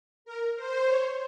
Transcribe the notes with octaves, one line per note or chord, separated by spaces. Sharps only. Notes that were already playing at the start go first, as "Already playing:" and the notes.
A#4
C5
C#5